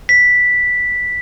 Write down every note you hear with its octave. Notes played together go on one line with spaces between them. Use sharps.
B6